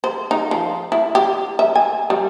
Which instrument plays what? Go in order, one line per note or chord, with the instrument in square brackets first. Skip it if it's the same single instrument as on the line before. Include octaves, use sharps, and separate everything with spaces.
[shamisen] C5
D#4
F3
E4
G4
E5
G#5
G3